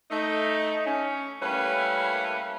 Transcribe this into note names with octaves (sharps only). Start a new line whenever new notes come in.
A3 D#4
C#4
G3 A3 A#3 C#4 E4 B4